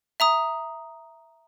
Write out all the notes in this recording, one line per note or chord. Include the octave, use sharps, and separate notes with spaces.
E5 A#5 D#6